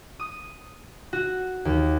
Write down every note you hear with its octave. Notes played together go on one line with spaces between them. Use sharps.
D#6
F#4
D#2